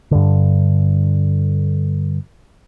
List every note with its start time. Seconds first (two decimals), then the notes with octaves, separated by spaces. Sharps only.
0.11 G2 D3